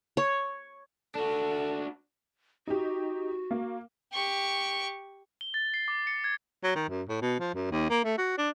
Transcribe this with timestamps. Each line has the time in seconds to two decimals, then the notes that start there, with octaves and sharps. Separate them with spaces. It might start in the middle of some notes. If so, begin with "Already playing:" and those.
0.17 C#5
1.15 D4 F#4 A4
2.67 D#4 F#4 G4
3.51 A#3
4.13 G4 C#6
5.41 G7
5.54 A6
5.74 C7
5.88 D6
6.07 C#7
6.24 G#6
6.63 F#3
6.75 D#3
6.89 F#2
7.09 A2
7.22 B2
7.39 F3
7.54 F#2
7.71 D#2
7.90 A#3
8.04 A3
8.18 F#4
8.38 D4